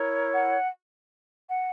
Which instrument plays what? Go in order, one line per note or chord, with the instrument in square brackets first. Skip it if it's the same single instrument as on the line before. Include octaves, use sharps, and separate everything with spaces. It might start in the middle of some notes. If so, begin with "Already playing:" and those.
Already playing: [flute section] E4 A#4 C#5
F#5
F#5